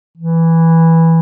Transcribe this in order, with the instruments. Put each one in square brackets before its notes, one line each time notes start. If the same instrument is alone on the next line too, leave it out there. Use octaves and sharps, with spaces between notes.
[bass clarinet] E3